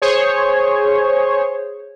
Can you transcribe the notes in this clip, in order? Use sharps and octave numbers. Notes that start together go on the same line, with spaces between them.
G#4 C5 C#5